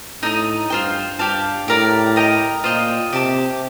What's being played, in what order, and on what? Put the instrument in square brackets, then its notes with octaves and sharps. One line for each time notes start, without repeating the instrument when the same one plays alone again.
[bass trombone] A2 [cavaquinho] D#4 A4 D#5 A#5
[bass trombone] G2 [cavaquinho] F4 C5 G5
[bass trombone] G2 [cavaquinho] G4 D5 F5 A5
[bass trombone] A2 [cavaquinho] G4 A#4 D5
[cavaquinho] A#4 D#5 G5 A#5
[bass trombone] A#2 [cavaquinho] F4 C5 D#5 G5
[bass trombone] C3 [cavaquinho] G4 D5 A5 D6